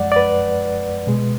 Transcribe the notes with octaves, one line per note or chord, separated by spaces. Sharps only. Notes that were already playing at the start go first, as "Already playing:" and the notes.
Already playing: F#2 F3 G#3 D5 F#5
D5
B4
B2 G#3